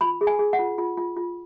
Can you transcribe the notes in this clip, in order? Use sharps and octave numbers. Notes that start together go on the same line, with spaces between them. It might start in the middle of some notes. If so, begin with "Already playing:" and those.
F4 B5
G#4
G#5
G#4
F#5
F4
F4
F4
F4